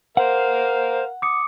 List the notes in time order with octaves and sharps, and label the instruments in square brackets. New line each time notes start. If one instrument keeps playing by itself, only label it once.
[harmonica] A#4 F5 [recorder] C5 [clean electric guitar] F#5
[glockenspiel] D6 D#6 C#7